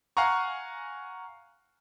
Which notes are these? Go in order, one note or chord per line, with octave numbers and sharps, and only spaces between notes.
F5 F#5 G#5 A#5 C#6